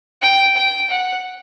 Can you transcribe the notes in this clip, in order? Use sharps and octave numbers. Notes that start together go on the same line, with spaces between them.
G5
G5
F#5